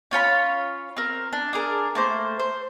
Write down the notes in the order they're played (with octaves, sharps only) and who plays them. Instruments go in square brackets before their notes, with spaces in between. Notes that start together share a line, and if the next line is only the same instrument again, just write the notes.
[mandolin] C#4 F4 C#5 B5
C4 A#4
D4
D4 G#4 A#4
A3 A#3 C5
C5